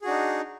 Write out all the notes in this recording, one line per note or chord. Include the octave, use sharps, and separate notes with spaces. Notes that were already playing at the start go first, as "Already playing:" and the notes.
D4 D#4 F#4 G#4